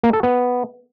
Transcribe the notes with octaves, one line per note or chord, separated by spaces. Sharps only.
A#3
A4
B3